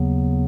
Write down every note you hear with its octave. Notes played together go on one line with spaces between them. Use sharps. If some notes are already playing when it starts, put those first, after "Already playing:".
Already playing: D#2 C#3 F#3 B3